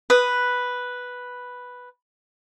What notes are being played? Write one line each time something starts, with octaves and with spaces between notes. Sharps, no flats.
B4 D#6